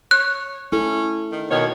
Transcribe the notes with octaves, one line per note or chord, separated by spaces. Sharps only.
C#5 F#6
C#4 E4 A4
D#3
B2 D#3 A#3 C#5